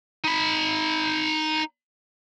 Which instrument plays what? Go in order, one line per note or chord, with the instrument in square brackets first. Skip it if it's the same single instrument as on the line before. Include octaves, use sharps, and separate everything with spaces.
[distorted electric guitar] D#4 B5